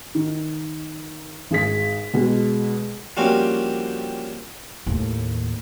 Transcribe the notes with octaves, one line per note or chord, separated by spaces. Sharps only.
D#3
G#1 G#4 B6
B2 G#3
F3 G3 A#3 C4 C#4 F#4
D#2 A2